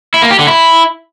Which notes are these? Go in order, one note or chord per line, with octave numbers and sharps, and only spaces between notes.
E4
A#3
G4
D3
E4